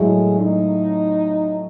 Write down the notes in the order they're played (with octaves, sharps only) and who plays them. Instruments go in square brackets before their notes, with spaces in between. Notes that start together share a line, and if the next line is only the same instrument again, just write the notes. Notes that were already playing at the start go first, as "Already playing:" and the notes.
Already playing: [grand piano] A2 F#3 A3 E4 [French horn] G#3
[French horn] D#4